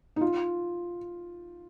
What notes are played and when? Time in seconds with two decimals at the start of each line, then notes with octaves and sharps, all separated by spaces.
0.16 D#4
0.21 F4